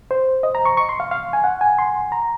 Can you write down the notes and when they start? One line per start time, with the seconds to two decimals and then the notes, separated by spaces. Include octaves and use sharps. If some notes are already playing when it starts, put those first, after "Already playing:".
0.11 C5
0.43 D#5
0.55 A#5
0.65 C#6
0.77 C#6
0.89 C6
1.00 F5
1.11 F5
1.33 G#5
1.44 F#5
1.61 G#5
1.79 C6
2.12 A#5